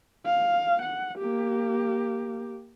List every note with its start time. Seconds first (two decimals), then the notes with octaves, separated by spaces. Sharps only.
0.25 F5
0.82 F#5
1.18 A#3 G4